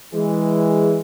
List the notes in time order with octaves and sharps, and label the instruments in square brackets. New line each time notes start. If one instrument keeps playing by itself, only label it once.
[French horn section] E3 G#3 G#4